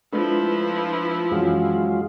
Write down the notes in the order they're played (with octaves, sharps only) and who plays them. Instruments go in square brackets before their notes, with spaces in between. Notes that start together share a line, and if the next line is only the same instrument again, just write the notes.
[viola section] F3 E4 [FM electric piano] G#3 A3 D4 [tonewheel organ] B4
[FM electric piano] F#2 E3 C#4 [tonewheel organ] F#3 G#3 F4